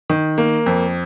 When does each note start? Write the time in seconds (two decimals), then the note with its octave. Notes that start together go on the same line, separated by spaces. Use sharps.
0.10 D#3
0.38 A#3
0.66 F2